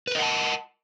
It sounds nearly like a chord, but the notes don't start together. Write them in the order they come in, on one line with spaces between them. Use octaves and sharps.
B4 A#4 D#5 F#5 A5